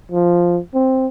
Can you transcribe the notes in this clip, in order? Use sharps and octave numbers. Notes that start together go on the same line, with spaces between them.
F3
C4